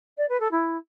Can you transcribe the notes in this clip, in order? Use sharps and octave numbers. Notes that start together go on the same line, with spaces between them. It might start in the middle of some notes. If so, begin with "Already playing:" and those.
D5
B4
A4
E4